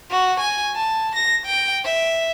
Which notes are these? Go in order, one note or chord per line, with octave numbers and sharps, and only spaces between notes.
F#4
G#5
A5
A#6
G5
E5